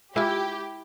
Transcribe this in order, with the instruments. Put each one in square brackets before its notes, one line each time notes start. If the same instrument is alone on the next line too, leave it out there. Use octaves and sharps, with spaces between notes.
[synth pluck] G#3 F4 [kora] E4 [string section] G4